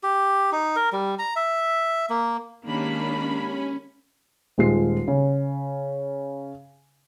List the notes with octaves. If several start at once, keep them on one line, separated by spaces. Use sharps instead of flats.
G4
D#4
A#4
G3
A#5
E5
A#3
D#3 G#3 A#3 C#4 D4 G4 B5
D#1 G#3 F4 C7
C#3